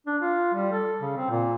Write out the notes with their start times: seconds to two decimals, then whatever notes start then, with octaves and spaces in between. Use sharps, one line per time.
0.07 D4
0.21 F4
0.54 G3
0.72 A4
1.01 C#3
1.17 C4
1.30 A#2